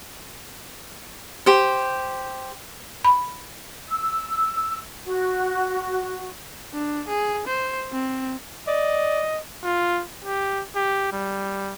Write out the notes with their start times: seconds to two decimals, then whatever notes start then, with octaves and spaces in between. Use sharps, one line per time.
1.46 G4 C5
3.05 B5
3.89 E6
5.05 F#4
6.74 D4
7.08 G#4
7.47 C5
7.92 C4
8.68 D5 D#5
9.64 F4
10.25 G4
10.76 G4
11.12 G3